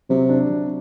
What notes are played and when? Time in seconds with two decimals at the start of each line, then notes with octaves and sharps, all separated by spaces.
0.10 C3 F#3
0.29 D4
0.49 F#3